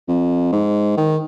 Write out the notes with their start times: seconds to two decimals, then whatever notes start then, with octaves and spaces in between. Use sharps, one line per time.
0.08 F2
0.52 G#2
0.97 D#3